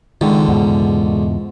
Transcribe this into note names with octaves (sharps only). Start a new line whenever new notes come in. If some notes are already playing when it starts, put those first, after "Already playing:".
C#2 D3 D#3
E2 G#2 B2